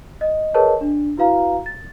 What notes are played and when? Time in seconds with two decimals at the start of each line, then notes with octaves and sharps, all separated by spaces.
0.21 D#5
0.54 G#4 A#4 B4 C#5 D#5 A5
0.81 D4
1.17 E4 F#4 B4 F5 A#5
1.66 A6